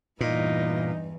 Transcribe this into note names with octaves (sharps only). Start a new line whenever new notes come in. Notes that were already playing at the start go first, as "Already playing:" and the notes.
E2 G2 A#2 E3 D#4